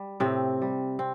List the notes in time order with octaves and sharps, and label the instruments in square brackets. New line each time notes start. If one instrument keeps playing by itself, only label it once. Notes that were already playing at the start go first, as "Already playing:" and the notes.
Already playing: [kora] G3
A2 C3 C4
G3
C4